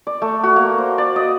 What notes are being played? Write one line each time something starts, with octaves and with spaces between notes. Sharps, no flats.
D5
A3
F#4
A#3
C5
D5
D#5